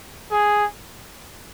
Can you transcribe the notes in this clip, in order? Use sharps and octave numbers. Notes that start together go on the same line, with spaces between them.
G#4